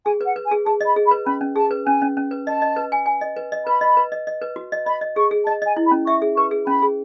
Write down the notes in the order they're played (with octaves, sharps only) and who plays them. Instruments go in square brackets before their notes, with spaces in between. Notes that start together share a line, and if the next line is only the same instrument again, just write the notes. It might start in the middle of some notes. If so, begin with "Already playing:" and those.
[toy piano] G#4 [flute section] G#5
[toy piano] B4
[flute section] F#5
[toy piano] B4
[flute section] G#5
[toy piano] G#4
[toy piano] G#4 [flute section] A5
[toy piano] D#5
[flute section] B5
[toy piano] G#4
[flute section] B5
[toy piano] B4
[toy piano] C#4 [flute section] B5
[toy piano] C#4
[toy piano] G#4 [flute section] A5
[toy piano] B4
[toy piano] C#4 [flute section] G#5
[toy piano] C#4
C#4
B4
[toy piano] D#5 [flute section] A5
[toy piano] D#5
B4
G#5
G#5
D#5
B4
D#5
[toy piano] B4 [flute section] B5
[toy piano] D#5
B4
D#5
D#5
B4
F#4
D#5
[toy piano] D#5 [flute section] B5
[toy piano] D#5
[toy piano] G#4 [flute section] C#6
[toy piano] G#4
[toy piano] D#5 [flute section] A5
[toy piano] D#5 [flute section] G#5
[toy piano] E4
[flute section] B5
[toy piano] C#4
[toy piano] E5 [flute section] C#6
[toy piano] G#4
[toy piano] B4 [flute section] C#6
[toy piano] G#4
[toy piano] C#4 [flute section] B5
[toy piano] G#4